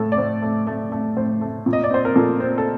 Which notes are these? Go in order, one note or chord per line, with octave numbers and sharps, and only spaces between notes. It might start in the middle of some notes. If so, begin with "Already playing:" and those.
Already playing: A2 A3 A4
D5
A2 C5
A3
A3
A3
A2 C5
A3
A#2
D#5
D5
C4 C5
A#4
A#2 A4
C4
A4